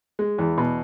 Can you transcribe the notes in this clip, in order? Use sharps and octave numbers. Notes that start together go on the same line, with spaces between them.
G#3
E2
B2